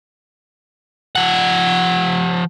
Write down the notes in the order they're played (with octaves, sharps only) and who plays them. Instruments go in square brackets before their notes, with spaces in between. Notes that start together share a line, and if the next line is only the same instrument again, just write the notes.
[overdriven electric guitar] F3 F#5